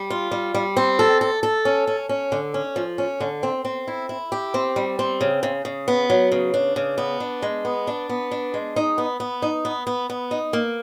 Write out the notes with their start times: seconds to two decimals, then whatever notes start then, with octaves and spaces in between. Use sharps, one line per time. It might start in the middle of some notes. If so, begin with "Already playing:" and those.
Already playing: G3
0.10 F4
0.31 G3
0.55 G3
0.77 C4
0.99 A4
1.21 A4
1.43 A4
1.65 C#4
1.87 C#4
2.09 C#4
2.32 D3
2.54 C#4
2.76 F3
2.98 C#4
3.20 D3
3.43 C4
3.65 C4
3.88 E4
4.09 E4
4.32 G4
4.54 C4
4.76 G3
4.99 C4
5.21 C#3
5.43 C#3
5.65 C#3
5.88 B3
6.10 F#3
6.32 C#3
6.54 D4
6.76 C#3
6.98 B3
7.20 D4
7.42 G#3
7.65 B3
7.87 D4
8.09 B3
8.31 D4
8.54 G#3
8.76 D#4
8.98 B3
9.20 B3
9.42 D#4
9.65 B3
9.87 B3
10.10 B3
10.31 D#4
10.53 A#3